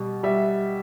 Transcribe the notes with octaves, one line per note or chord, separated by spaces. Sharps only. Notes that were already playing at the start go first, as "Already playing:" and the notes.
Already playing: B2 G3
G3 E5